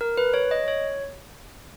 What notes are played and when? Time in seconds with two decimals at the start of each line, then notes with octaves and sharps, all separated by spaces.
0.01 A#4
0.18 B4
0.34 C#5
0.51 D#5
0.68 C#5